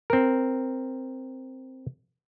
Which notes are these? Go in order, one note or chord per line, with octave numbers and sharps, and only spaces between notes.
C4 A#4